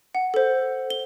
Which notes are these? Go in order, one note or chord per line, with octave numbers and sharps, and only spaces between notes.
F#5
A4 C5
G7